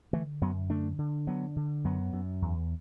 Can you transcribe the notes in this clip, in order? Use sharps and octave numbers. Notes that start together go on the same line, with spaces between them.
D3 E3 A3
F#2 F#3 B3
D3 A3 D4
D3
D3 F#3 B3
D3
F#2 F#3 B3
F#2
E2